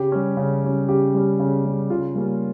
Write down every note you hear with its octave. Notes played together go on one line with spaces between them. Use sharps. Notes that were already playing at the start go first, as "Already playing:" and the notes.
Already playing: C#3 G4
G3 C#4
C#3
G3 C#4
C#3 G4
G3 C#4
C#3
G3 C#4
C#3 F4
G3 A#3 C#4